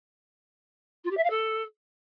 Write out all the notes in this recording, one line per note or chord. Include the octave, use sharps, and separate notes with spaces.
F4
G4
E5
F5
A4